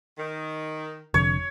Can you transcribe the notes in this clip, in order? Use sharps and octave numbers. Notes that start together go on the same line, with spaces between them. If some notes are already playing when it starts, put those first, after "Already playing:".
D#3
F1 F2 D3 C#5